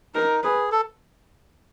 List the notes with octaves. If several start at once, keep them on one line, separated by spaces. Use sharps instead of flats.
D#4 A#4
G#4 B4
A4